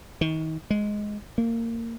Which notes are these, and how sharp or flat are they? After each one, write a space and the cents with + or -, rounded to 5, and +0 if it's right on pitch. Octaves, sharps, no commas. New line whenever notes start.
D#3 +35
G#3 +5
A#3 -20